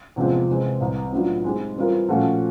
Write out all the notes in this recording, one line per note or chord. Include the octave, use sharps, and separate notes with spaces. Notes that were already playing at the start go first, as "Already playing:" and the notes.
E2 C3 F3 G#3 C4
C3 E3 G#3 C4
C2 C3 E3
A2 F#3 B3 D4 F4
G#3 C4 D#4 G4
E3 G3 C4 F4 A#4
A#2 F3 A3 C#4 F#4